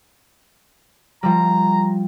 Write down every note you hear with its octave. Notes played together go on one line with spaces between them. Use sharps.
F3 G3 A#5